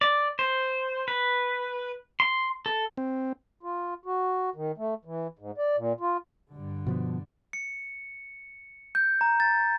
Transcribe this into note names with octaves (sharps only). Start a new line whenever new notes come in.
D5
C5
B4
C6
A4
C4
F4
F#4
D#3
A3
E3
G#2
D5
A#2
F4
G2 D3
B2 F3 B3
C#7
G6
A#5
A6